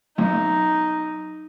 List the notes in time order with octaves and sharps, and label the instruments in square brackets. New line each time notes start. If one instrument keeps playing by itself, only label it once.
[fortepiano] B1 F#2 [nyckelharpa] D#4